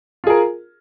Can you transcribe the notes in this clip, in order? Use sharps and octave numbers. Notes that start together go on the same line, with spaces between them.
F4 G#4 A#4